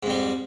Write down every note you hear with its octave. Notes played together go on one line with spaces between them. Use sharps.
F2 G#2 G3